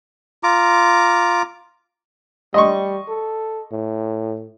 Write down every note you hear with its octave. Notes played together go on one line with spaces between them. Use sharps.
F4 A#5 D6
G3 D#5 C6 C#6
A4
A2